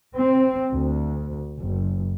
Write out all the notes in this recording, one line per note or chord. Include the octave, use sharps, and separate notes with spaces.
C4
D2
F#1